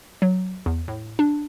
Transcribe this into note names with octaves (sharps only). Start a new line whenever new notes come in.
F#3
E2
A2
D4